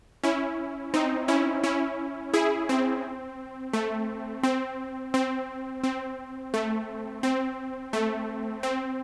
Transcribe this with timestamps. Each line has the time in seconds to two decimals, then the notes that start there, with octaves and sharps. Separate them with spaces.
0.24 C#4 E4
0.94 C4 D#4
1.28 C#4 E4
1.64 C#4 E4
2.33 E4 G#4
2.69 C4
3.73 A3
4.43 C4
5.14 C4
5.84 C4
6.54 A3
7.23 C4
7.93 A3
8.63 C4